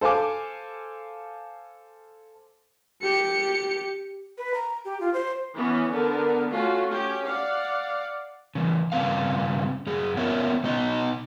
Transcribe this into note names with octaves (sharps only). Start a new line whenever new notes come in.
A4 C5 F5 G#5 D6
G4 C#7
B4
A#5
G4
F4
C5
E3 B3 C#4
D3 B3 A#4
A3 C#4 F4 F#4
C#4 G4
D5 F5 F#5
C#3 E3
G2 C#3 C4 B4 F5
F#2 G#4
B3 C#4 F4 A#4 C#5 E5
B2 B3 D#4 D#5 A#5